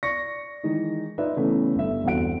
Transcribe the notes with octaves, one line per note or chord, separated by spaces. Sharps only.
D5 C#6 A#6 C#7
D#3 E3 G#3 D#4
D#4 F4 B4 D5 E5
C#3 E3 A3 B3 C#4
G1 E5
G1 E2 C4 F#4 F#5 D7